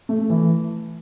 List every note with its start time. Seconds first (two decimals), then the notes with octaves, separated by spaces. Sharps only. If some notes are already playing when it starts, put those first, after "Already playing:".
0.09 A3
0.30 E3